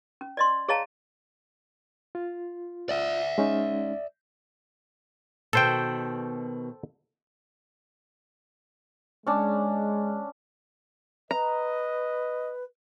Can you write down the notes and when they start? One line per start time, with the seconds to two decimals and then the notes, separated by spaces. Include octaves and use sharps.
0.21 C#4
0.37 D5 D#5 C6
0.68 G#4 C#5 D#5 F5 A5 A#5
2.15 F4
2.89 D5 E5
3.38 G#3 C#4 D#4
5.53 B2 D#3 A4 C5 G5
9.27 G#3 C#4 D4
11.31 B4 D#5 A#5